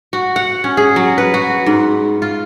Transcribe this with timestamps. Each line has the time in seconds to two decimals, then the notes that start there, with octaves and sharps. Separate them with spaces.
0.13 F#4
0.36 F#5
0.64 C#4
0.77 G#4
0.96 F#3
1.18 B4
1.34 F#4
1.66 G#2
2.22 F4